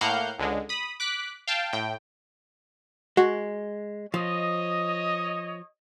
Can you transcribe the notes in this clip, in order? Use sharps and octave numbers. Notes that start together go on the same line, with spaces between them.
A2 A#3 F5 F#5 F6 G6
C#2 D3 G#3
B5 D#6
D6 F#6 B6
F5 G5 A5
A2 G5
G#3 F#4
F3 C#5 D#5